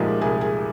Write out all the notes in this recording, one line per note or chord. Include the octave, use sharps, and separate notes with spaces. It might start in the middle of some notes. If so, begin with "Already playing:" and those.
Already playing: C2 A#2 F3 G#3 D#4 G4
C2 G#4
G#4